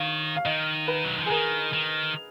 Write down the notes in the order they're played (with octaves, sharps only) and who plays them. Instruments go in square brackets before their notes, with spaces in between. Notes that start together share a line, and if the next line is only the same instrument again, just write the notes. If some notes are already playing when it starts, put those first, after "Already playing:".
Already playing: [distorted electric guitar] D#3 [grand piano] C#5 F5
[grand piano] F5
[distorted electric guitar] D#3 [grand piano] D#5
[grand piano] B4
[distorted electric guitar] F#3
F3
[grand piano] G#4
[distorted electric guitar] D#3 [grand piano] A#4
[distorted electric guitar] D#3